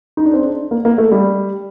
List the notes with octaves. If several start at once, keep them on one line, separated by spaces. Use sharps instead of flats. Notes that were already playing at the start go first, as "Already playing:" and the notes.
D#4
D4
C4
D4
A#3
A#3
A3
G3